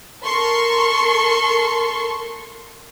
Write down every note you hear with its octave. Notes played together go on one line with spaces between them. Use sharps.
A4 A#4 C6 C#6